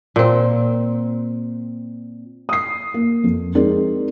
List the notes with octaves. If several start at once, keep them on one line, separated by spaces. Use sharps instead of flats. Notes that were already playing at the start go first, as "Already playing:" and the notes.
A#2 C4
D#6 C7
A#3
F2
G#3 C4 D#4 A#4 D5